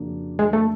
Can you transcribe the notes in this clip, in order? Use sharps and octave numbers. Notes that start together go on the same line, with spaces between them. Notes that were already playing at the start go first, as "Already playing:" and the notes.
Already playing: F2 C#3 F#3 A#3 D4
G#3
A3